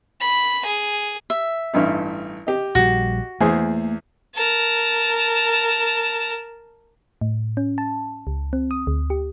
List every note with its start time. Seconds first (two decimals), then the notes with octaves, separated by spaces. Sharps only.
0.20 B5
0.65 G#4
1.30 E5
1.74 A1 G2 D#4
2.47 G4 D#5
2.75 A#1 G3 F#4
3.41 E2 A3 A#3 G#4 C5
4.35 A#4 A5
7.21 A2
7.57 C#4
7.78 A5
8.27 C#2
8.53 C4
8.71 D#6
8.87 D2
9.10 G4